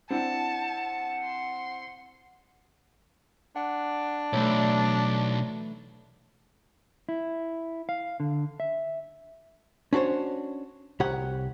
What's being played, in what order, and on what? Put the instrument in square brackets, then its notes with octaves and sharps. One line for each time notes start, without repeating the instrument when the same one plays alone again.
[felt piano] C4 D4 E4 [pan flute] F#5 [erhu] A5
[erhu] C6
[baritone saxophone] D4 [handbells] F#5
[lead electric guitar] B1 [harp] E3 A3 [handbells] C#5 D5
[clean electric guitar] E4
F5
D3
E5
[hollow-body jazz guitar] C#4 D4 F#4 C5 C#5
C2 G4 C#5 F#5